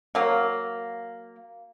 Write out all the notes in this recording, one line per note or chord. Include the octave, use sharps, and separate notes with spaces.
F#3 A#3